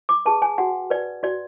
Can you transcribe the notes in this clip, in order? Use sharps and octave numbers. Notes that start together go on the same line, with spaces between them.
D6
G#4 B4 A5
G#5
F#4 F#5
B4 D5
F#4 D5